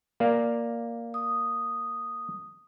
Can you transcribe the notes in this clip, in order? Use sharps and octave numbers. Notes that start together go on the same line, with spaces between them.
A#3 D5 F5
D#6